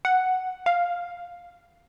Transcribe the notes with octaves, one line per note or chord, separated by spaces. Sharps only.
F#5
F5